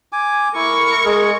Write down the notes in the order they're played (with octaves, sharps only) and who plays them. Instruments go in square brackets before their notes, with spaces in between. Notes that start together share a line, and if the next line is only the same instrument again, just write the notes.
[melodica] G#5 D6
[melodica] E4 [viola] A#4 C#6
[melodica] G#3 G#4